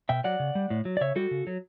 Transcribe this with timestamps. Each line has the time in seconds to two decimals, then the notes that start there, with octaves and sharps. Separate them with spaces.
0.09 B2 E5 G5
0.24 F#3 D5 F#5
0.40 C#3
0.55 G3
0.70 A2
0.85 F#3
0.97 D5
1.01 C#3 C#5 E5
1.16 G3 F#4 A4
1.31 C#3
1.47 F#3